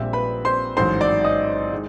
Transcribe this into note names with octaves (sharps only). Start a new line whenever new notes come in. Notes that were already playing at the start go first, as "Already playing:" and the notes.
Already playing: A#1 A#2 G3 C4 E5
B4 B5
C5 C6
A1 G#2 D#3 F#3 C5 C6
D5 D6
D#5 D#6
D#3 G#3